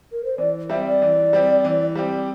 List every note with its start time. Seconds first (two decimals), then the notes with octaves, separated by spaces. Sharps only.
0.12 A#4
0.25 C5
0.38 E3 D5
0.70 G3 C4 G4 E5
0.86 D5
1.02 E3
1.33 G3 C4 G4
1.64 E3
1.96 G3 C4 G4